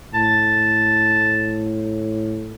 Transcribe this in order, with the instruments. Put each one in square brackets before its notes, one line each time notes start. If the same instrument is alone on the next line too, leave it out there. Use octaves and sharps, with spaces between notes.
[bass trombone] A2 [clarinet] A5